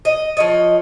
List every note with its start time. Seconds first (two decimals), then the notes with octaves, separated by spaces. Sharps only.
0.05 D#5
0.37 F3 C#5 D#5